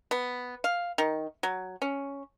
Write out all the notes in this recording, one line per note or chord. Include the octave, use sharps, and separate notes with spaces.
B3
F5
D#3
F#3
C#4